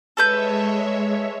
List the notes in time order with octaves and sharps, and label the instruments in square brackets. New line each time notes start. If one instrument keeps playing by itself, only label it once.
[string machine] G#3 C#5 E5 [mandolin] A4 B4 G6